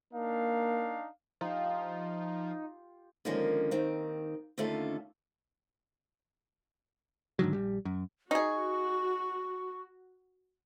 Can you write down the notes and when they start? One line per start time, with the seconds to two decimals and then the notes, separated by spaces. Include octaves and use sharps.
0.14 A#3 D4 D#4 F5
1.41 F3 D#4 F4 G4
3.25 D3 D#3 F3 G#3 A#3 C#4
3.71 D#2 D#3 C4
4.58 D#2 D3 A3 C#4 F4 A4
7.39 G#2 D3 D#3 F#3
7.53 A#1 G3
7.85 F#2
8.31 D#4 F#4 G#4 C#6